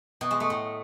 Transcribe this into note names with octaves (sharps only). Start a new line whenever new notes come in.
B2
G#3
A3
A2